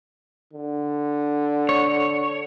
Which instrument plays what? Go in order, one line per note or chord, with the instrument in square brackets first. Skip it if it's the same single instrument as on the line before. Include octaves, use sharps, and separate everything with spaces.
[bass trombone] D3
[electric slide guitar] C#5